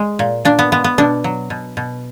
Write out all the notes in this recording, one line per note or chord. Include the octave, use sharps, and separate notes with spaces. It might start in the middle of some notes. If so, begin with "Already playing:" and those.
Already playing: G#3
A#2
A#2 D4
B3
G#3 B3
B3
B2 D4
F#3
B2
B2